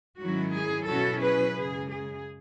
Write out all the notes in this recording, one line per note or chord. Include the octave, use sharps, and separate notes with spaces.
G#2 D#3 F#3 C#4 E4 F#4
G#4
B2 F#3 C#4 E4 F#4 A4
G#4 B4
F#2 C#3 G#3 G#4
G#4